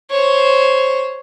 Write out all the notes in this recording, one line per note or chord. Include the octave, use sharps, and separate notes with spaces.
C5 C#5